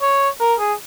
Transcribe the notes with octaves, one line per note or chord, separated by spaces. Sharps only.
C#5
A#4
G#4